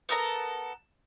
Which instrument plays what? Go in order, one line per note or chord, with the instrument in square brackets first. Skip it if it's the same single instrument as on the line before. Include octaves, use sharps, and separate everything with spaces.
[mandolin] B3 A4 A#4 A#5